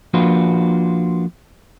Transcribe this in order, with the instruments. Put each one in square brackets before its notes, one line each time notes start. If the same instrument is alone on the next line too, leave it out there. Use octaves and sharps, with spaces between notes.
[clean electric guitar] F3 A#3 D4 F4 F#4 B4